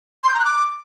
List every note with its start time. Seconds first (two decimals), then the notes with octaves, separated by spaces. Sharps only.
0.24 C6
0.29 G6
0.34 A#5
0.40 F#6
0.45 D6